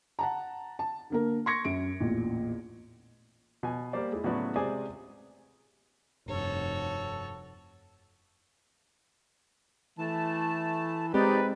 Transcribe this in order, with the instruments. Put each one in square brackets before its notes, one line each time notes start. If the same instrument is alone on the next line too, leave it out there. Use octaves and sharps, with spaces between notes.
[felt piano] F#5 A5 A#5
A5
D3 A#3 A#4
C6 C#6 G#6 A#6 C#7
F#2 D7
A1 E2 A#2
[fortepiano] B2 G#5
G3 A#3 G4 C5 D5
G#3 E4
A2 C#3 F#3 B3 F#4 D5
C3 G#3 G#4 C5 D5 G#5
[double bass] F1 [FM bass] G2 [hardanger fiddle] F#4 C#5 [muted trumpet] A4
[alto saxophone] E3 [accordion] A3 A5
[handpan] G#3 C4 [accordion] D#4 D5 [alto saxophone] G4 [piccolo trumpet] B4